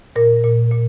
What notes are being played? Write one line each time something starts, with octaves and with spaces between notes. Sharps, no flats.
A#2 A#4
A#2
A#2